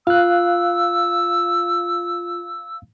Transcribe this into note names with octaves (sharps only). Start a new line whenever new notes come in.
F4 F5 E6 F#6